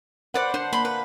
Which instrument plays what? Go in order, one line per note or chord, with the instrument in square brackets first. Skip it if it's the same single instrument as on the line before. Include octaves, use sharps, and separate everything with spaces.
[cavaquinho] B4 D5 D6 [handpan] C5 F#5
[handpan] D4 [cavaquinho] C5
[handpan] A#3 [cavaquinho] B5 C6
[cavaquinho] B4